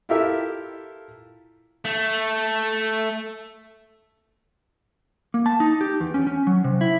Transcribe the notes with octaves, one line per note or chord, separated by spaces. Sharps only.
E4 F4 G4 A4 A#4 E5
A3
A#3
A5
D#4
G4
E2
C#4
C#4
F#3
C3
E4